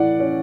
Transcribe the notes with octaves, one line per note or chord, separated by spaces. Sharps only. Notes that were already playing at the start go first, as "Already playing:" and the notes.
Already playing: A2 E3 D5 F#5
C#4